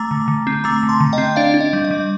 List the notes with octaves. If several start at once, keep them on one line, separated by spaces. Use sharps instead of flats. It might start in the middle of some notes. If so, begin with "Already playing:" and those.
Already playing: A3 A#5 D6
D3
D3
C4
A3 A#5 D6
D3
A5 C6
D3
D#5 G5
C4
D4 D5 F5
D4
D#5
G3
D#5
G3